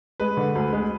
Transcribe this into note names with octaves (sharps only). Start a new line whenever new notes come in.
G#3 B4
D3
D2
G#3